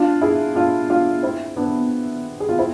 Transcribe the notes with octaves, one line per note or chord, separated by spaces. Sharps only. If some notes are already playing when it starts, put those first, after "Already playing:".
Already playing: D4 F4
E4 G#4
D4 F4
D4 F4
C4 E4
B3 D4
G#4
F4
C4 E4